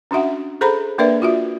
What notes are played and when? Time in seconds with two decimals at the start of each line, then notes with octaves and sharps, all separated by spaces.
0.11 C#4 D4 F#4 E5 F#5
0.61 G#4 A4 C5 A#5 B5
0.98 A#3 D4 A#4 B4 D5 E5
1.22 F4 F#4 E5